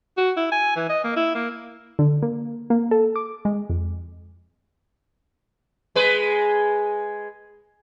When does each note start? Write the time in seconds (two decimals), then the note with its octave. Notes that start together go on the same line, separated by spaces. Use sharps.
0.18 F#4
0.37 E4
0.52 G#5
0.76 E3
0.90 D#5
1.04 A#3
1.17 E4
1.35 A#3
1.99 D3
2.22 A#3
2.70 A#3
2.91 A4
3.16 D6
3.45 G#3
3.69 F2
5.96 G#3 B4